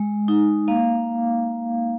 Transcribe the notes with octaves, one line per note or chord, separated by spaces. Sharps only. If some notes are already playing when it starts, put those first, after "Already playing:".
Already playing: G#3
D#4
A#3 F5